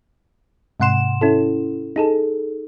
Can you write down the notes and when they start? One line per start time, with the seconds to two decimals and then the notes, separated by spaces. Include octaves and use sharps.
0.80 G#2 C3 F#5 C6 E7
1.21 C#4 E4 A4
1.96 D#4 G#4 A4